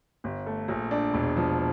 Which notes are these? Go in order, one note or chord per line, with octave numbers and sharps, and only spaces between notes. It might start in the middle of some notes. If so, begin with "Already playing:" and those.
G1
A3
A#1
D4
E1
F3